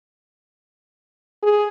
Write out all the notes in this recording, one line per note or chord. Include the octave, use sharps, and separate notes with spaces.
G#4